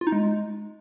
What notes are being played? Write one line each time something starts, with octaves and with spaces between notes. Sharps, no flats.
F4
D#4
G#3